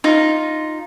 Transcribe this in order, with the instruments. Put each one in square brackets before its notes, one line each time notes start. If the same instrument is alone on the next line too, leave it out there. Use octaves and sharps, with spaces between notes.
[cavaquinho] D#4 F4